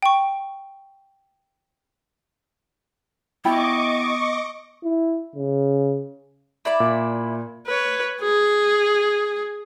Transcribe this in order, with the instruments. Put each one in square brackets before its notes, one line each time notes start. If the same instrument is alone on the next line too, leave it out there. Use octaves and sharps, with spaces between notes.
[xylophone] G5 C#6
[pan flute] B3 [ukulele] E4 G5 B5 [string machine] D#5 C#6 D6
[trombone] E4
C#3
[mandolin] E4 D5 B5
[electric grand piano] A#2
[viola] B4 C#5
G#4